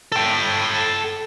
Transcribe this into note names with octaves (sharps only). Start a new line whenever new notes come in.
A4 G5